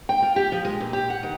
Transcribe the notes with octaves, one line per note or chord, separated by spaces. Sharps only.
G5
F4
G4
F3
G#3
A#2
G4
F#5
D#3